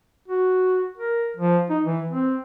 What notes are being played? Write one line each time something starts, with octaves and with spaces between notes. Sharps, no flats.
F#4
A#4
F3
D#4
E3
C4